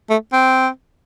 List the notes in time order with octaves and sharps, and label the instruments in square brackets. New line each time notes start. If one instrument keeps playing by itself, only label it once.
[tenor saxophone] A3
C4